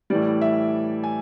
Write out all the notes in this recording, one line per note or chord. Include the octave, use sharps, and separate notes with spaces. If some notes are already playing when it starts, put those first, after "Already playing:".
A2 E3 G3 D5
E5
G#5